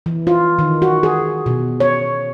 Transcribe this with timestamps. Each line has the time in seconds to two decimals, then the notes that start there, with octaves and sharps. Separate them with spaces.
0.06 E3
0.27 F4
0.59 D#3
0.82 F#4
1.03 G#4
1.46 B2
1.80 C#5